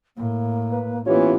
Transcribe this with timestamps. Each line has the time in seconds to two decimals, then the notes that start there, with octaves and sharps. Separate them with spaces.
0.17 A2 A#3
0.72 B4
1.06 E3 A#3 B3 C#4 F4 G4 C#5